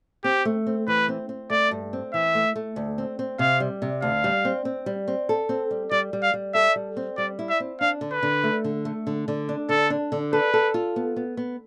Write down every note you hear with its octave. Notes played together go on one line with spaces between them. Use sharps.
C4 G4
A3
C4
E3 B4
C4
C4
A3 D5
G2
C4
E3 E5
A3
A3
D2
C4
C4
C3 F5
G3
C3
D2 F5
G3
C4
C4
G3
C4
A4
C4
G3
G3 D5
G3
F5
G3
A4 E5
G3
C4
G3 D5
E4
E5
C4
D4 F5
D3
B4
D3
A3
D3
A3
D3
D3
D4
D3 A4
D4
D3
A4 B4
A4
F4
B3
B3
B3